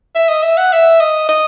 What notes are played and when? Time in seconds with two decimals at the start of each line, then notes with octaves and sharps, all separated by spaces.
0.15 E5
0.29 D#5
0.43 E5
0.57 F#5
0.73 E5
1.01 D#5
1.29 D#5